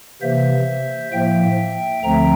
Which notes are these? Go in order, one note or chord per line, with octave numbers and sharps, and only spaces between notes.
C3 E3 A#3 C5 E5
A2 F3 A#3 E5 G5
D2 D3 F3 A3 C4 G5 A#5